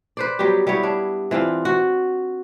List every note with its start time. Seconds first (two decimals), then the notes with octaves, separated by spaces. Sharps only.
0.17 B4 C5 D5
0.39 F#3 G3 B3 G4
0.67 G3 B3 E4 C#5
0.83 D4
1.31 E3 C4 D4 F4
1.65 F#4